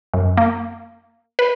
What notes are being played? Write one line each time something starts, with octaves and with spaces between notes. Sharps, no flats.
F#2
A#3
B4